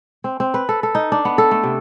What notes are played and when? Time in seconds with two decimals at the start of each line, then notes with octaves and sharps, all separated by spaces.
0.24 C4
0.40 C4
0.54 B4
0.69 A4
0.83 A4
0.95 D#4
1.12 D4
1.25 B3
1.38 A4
1.51 A3
1.63 C3